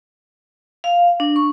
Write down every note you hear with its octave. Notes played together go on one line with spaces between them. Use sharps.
F5
D4
C#6